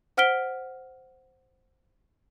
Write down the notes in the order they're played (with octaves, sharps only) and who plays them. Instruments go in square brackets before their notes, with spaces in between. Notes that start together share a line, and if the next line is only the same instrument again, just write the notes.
[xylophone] C5 F#5 F6 B6 D7 G7